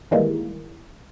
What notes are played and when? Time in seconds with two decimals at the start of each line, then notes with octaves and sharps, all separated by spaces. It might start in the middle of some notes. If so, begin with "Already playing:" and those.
0.11 G#2 D#3 E3 G3 G#3 A#3